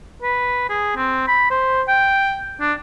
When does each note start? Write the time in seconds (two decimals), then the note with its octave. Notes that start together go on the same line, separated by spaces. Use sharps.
0.22 B4
0.69 G#4
0.96 C4
1.27 B5
1.50 C5
1.88 G5
2.60 D4